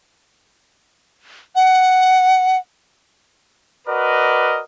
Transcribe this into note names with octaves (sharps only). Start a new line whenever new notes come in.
F#5
F#4 A#4 B4 D5 D#5